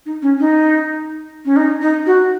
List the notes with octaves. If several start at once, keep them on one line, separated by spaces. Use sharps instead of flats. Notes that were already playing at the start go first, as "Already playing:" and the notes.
D#4
C#4
D#4
C#4
D#4
D#4
F#4